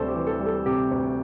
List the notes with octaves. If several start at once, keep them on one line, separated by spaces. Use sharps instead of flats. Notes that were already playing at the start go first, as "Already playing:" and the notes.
Already playing: D2 C3 G3 A4 C5 D5
G4
E3
A4
G3
A4
C3 G4
D2